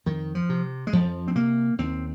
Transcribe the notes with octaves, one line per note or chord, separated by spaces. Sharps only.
F2 D#3
F3
C3
G#3
F2 F3
C4
C3 A#3
D#2 C4